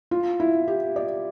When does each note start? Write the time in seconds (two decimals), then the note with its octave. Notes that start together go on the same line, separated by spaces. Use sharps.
0.11 F4
0.40 E4
0.68 G4
0.96 D5